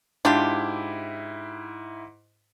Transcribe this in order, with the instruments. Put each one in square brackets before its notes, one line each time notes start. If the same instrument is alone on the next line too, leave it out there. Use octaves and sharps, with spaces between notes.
[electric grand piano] G#2 E4 [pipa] D4 F4 G4